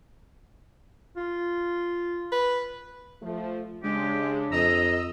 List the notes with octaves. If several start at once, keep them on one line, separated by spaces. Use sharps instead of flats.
F4
B4
F3 A3
C#3 G#3 D4 G4
F2 D#5 A#5 E6